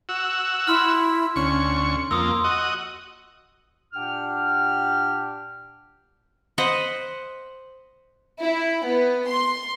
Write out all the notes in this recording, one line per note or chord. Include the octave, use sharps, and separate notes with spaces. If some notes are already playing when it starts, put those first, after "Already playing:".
F#4 E6
E4 C6 F6
D2 C#4 C#6
F2 A#3 C6 D#6 E6
F#4 D#5
A#2 D4 G4 F#5 G5 F6
C5 D#5 F#5 B5
E4
B3
C6